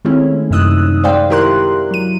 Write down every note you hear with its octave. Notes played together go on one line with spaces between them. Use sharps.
D#3 G#3 A3 C4 C#4 E4
F#2 C3 D#4 D#6 E6 F#6
G#3 C5 D5 F5 G5
D#3 E4 G4 A#4 C6 F#6
F#3 D#7